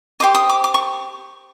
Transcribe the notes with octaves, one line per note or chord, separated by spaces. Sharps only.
G4 C5 D#5 D6
D#6
D6
D6
C#6